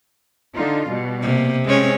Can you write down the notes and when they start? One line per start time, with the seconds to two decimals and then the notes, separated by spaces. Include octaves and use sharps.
0.55 D3 D#4 F4
0.87 B2 G3
1.22 C3 A#3
1.65 G#3 C4 C#4 C#5